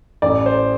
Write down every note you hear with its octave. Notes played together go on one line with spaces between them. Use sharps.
A1 D5
C5